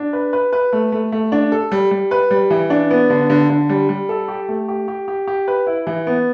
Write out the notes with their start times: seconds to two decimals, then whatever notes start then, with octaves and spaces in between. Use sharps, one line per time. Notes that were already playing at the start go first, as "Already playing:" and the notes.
Already playing: D4
0.13 B4
0.33 B4
0.53 B4
0.73 A3
0.92 A3
1.12 A3
1.32 D4
1.52 A4
1.72 G3
1.91 G3
2.11 B4
2.30 G3
2.50 E3
2.70 D4
2.91 B3
3.10 D3
3.30 D3
3.49 D3
3.69 G3
3.89 G3
4.09 A4
4.28 G4
4.48 A3
4.68 G4
4.88 G4
5.08 G4
5.27 G4
5.48 B4
5.67 E4
5.87 E3
6.07 B3